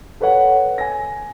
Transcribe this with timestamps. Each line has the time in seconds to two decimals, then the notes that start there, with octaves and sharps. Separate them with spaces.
0.20 A4 B4 C#5 F#5
0.78 G#5 A#6